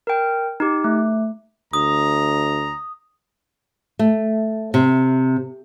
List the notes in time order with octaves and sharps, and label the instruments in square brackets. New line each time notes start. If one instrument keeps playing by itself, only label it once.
[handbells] A#4 G5
D#4 G4
A3
[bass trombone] D2 [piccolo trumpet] A#5 [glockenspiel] D#6
[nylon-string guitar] A3
C3